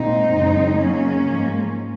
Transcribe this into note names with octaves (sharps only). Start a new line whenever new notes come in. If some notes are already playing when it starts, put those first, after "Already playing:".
Already playing: A#2 G#3 C4 D#4
F#2 C#3 G#3
F#2 C#3 F#3 A#3 C#4
G#2 F3 G#3